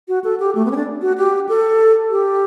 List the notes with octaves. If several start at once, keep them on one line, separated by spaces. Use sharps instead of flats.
F#4
A4
G4
A3
B3
C#4
D4
F#4
G4
A4
G4